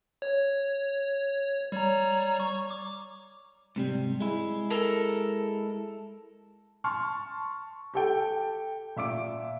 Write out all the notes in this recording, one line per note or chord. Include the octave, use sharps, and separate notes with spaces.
C#5
G3 C#5 A#5
C#6
D6
G#2 C3 G3
G#3 E4
A4 A#4
A5 C6 C#6 F6
G4 A4 G5
A#2 E5 D6 D7